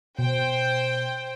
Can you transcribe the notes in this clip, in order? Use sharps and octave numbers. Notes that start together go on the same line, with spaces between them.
B2 C5 G5